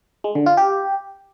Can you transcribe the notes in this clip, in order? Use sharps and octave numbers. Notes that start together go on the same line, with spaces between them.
G#3
D3
F4
G4